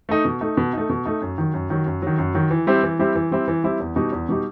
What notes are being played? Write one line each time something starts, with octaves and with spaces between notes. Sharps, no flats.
A3 D#4
B2
A3 D#4
B2
A3 D#4
B2
A3 D#4
F#2
D#3 F#3
F#2
D#3 F#3
F#2
D#3 F#3
F#2
D#3 F#3
E3
G3 C4 E4
E3
G3 C4 E4
E3
G3 C4 E4
E3
G3 C4 E4
E2
B2 G3 D#4
E2
B2 G3 D#4